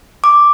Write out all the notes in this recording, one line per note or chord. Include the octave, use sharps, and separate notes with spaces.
D6